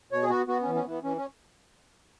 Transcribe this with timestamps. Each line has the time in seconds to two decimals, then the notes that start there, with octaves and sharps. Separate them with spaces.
0.12 B2 C#5
0.23 G#4
0.29 B3 F#4
0.48 B3 F#4
0.62 C#4
0.67 E3
0.75 C#4
0.85 E3 B3
1.03 E3 C#4
1.17 C#4